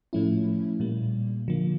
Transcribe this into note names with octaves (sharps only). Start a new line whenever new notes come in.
A2 F3 A3 C#4 E4
A#2 G3 A#3
D3 F3 A#3